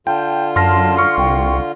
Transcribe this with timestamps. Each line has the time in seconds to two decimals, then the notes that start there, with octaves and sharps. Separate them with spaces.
0.07 D3 F4 G5 A5
0.56 F#2 A5 C6 F6 A#6
0.97 C6 C#6 F6
1.17 C2 G5